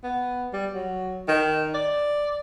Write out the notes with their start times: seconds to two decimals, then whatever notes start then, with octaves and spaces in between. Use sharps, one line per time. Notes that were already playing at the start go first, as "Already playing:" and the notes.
0.04 B3
0.53 G3
0.74 F#3
1.29 D#3
1.74 D5